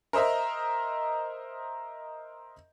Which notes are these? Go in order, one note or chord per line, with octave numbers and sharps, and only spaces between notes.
A#4 C5 D#5 E5 A#5